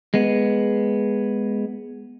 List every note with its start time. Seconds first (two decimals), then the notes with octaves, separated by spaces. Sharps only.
0.14 G#3 B3